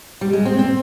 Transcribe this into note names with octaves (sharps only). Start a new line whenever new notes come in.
G3
G#3
C4
C4